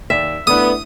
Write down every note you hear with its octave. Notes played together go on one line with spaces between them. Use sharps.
D#2 D5 E5
A3 B3 D4 E4 D#6